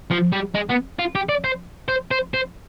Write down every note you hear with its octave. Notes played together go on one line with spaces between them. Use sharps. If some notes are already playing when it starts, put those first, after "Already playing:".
F3
G3
G#3
B3
F4
G4
D5
C5
C5
C5
C5